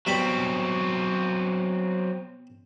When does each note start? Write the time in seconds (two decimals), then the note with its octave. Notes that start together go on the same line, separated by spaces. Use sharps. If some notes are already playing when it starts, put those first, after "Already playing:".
0.06 B2 F#3 G3 C4 B5